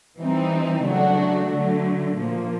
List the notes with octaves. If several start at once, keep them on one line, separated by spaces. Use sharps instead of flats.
E3 G3 C4 D#4
C#3 F#3 A3 D4 F#4
D3 F#3 A3
A#2 F3 A#3